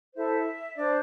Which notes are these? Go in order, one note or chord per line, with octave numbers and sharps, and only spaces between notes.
E4 A4 C5 E5
D4 C5 D5